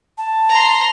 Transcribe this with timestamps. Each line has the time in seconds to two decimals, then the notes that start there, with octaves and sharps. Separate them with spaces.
0.18 A5
0.49 A#5 C6